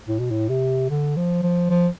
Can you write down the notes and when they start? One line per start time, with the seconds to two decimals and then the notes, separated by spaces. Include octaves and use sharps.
0.08 A2
0.20 B2
0.31 A2
0.49 C3
0.90 D3
1.17 F3
1.43 F3
1.70 F3